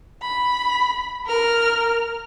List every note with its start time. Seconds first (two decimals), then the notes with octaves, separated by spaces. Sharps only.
0.22 B5
1.26 A#4 F6